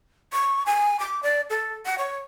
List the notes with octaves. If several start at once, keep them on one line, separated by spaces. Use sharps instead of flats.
C#6
G#5
D6
D5
A4
F#5
C#5